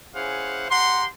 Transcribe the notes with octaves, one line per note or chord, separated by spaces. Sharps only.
C#4 E4 G#4 C5 F5 F#5
G4 F#5 A#5 C6